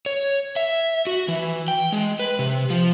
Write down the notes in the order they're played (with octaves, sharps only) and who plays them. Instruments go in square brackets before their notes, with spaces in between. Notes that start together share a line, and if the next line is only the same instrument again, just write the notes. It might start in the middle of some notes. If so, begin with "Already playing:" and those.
[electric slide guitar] C#5
E5
F#4
E3
G5
G#3
B4
C3
F3